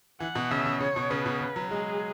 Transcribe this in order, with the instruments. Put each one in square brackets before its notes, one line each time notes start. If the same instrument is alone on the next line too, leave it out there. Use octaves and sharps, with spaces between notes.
[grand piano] E3 [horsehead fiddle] F#5
[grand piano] B2
[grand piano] C#3 [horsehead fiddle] E5
[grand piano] C#3
[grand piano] C#3 [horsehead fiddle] C#5
[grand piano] B2
[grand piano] C#3 [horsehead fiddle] B4
[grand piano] B2
C#3
F#3
[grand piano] G#3 [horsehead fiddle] G#4